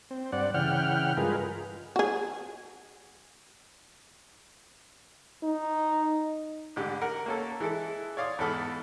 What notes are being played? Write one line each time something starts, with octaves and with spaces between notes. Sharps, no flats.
C4
G2 C4 D5 F#5
C#3 E3 F#5 G5 F6
G2 G#3 F4 G#4 A#4 B4
F#4 G#4
D#4
A1 G#2 D3 G4
A#4 F#5
A#3 C#4 A4
E3 G#3 E4 A4
C#5 D5 F5 C6 D#6
E2 G#2 B3 A4 B5 F6